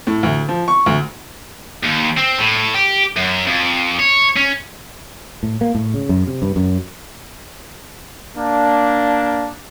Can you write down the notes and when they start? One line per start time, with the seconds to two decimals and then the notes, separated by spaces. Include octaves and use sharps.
0.07 A2
0.23 D2
0.49 F3
0.68 C#6
0.86 D2
1.83 D#2
2.17 C4
2.39 A2
2.74 G4
3.16 F#2
3.47 F2
3.99 C#5
4.36 C#4
5.43 A2
5.61 A#3
5.75 A2
5.94 C#3
6.09 F#2
6.27 C3
6.42 G2
6.56 F#2
8.37 A#3 D4